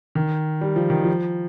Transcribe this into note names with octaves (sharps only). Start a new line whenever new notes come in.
D#3
G3
F3
D#3
F3